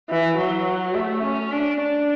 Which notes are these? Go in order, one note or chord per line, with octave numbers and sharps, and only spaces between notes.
E3
F#3
A3
C#4
D4
D4